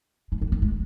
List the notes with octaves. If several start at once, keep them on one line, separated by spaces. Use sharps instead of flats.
G#3
A3
C4
G#3